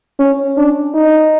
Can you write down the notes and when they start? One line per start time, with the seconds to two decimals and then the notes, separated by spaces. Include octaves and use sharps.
0.19 C#4
0.57 D4
0.95 D#4